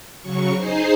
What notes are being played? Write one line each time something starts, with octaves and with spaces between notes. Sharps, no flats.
C#3 F#3 C#6
D#4 G#4 C5 C6